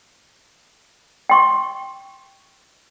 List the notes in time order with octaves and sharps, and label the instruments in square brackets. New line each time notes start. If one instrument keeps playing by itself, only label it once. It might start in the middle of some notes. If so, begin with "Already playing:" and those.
[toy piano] G5 C6 C#6